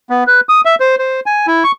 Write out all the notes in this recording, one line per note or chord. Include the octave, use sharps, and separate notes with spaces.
B3
B4
D#6
E5
C5
C5
G#5
E4
C#6